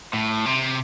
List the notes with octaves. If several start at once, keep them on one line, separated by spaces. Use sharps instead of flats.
A2
C3